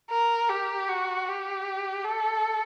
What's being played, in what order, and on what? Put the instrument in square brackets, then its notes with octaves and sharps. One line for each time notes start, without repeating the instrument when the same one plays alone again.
[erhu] A#4
G4
F#4
G4
A4